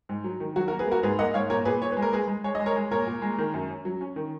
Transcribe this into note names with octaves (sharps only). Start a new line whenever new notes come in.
G#2
F#3
D#3
F#3 F#4
F#4 A#4
A#3
G#4 B4
A#3 F#4 A#4
G#2 G#4 B4
A#3 D#5 F#5
G#2 C#5 F5
A#2 A#4 C#5
A#2 G#4 B4
A#2 C#5
G#3 B4
A#4
G#3 G#4 B4
G#3
G#3 C#5
G#3 D#5
A#4 C#5
G#3
A#2 A#4 C#5
A#2
G#3
D#3
F#2
C#4
F#3
C#4
D#3